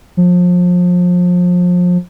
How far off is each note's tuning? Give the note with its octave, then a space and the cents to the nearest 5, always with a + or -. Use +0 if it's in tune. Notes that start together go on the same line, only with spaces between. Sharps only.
F3 +30